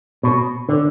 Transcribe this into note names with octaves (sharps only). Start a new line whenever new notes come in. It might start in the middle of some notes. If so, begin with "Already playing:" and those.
B2
D3